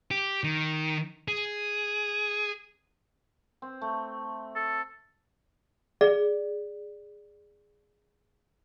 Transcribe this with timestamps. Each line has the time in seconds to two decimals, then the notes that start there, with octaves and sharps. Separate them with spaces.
0.11 G4
0.44 D#3
1.28 G#4
3.62 C4
3.81 A3
4.55 A4
6.01 G#4 D5